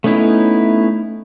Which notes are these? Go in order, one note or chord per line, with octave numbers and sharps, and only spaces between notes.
A3 B3 C#4 D#4 E4